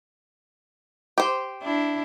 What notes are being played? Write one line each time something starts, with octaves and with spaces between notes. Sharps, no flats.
G4 C5
D4 E4